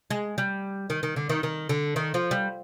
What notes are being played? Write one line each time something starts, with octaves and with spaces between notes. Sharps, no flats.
G#3
G3
D#3
D#3
D3
D#3
D#3
D3
D#3
F3
G3